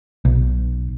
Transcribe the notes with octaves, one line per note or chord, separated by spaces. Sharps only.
B1